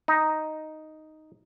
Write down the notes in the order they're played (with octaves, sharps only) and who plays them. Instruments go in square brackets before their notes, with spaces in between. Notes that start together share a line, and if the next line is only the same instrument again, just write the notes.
[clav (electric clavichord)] D#4